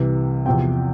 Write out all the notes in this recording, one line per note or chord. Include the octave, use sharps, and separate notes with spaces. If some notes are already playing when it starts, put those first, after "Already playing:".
Already playing: C2 C3 E3
E2 C3 F3 C4 G5